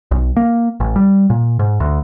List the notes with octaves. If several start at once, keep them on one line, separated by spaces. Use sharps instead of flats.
B1
A#3
A1
G3
A#2
G#2
D2